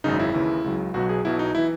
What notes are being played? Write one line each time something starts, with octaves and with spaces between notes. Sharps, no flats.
G#1 F#2 C#3 D#4
E4
D#2 C#3 E3
C#2 C#3 F#3
B1 B2 F#3 F#4
G#4
B1 B2 F#3 E4
D#4
E3 E4